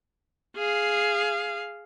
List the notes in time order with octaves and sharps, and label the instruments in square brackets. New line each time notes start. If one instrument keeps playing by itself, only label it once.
[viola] G#4 F5